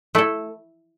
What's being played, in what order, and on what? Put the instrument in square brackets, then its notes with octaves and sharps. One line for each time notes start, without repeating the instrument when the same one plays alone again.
[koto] A3 E4 A4